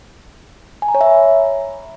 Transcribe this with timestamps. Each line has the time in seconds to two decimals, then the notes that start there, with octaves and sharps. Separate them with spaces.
0.82 G#5
0.88 A#5
0.95 C#5
1.01 E5
1.07 B5